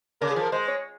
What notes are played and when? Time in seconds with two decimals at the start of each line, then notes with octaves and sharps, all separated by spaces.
0.21 C#3 A#4
0.31 G#4
0.36 F3
0.42 A#4
0.52 G#3 C5
0.68 C#5